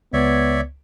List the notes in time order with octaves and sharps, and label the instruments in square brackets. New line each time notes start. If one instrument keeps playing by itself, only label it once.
[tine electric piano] C#2 G#6 [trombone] B3 [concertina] C#5 D5 E5